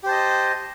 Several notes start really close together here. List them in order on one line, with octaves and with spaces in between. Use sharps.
G4 C5 A5 D#5